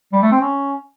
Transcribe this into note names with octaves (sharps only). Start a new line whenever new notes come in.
G3
A3
C4
C#4